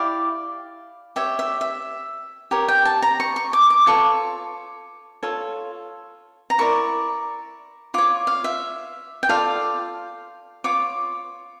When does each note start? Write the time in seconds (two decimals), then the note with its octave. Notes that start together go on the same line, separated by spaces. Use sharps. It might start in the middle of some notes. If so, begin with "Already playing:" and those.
Already playing: E4 G4 D5 F5
1.16 G4 C#5 E5
1.39 E5
1.61 E5
2.51 G4 A#4 C#5
2.68 G5
2.85 A5
3.02 A#5
3.20 C#6
3.36 C#6
3.53 D6
3.70 D6
3.87 F4 A4 C#5 C#6
5.23 F4 A4 C#5
6.50 A#5
6.58 E4 A#4 D5 C#6
7.94 F4 C#5 D6
8.27 F5
8.44 E5
9.23 G5
9.29 F4 A4 D5 F5
10.64 F4 C#5 D6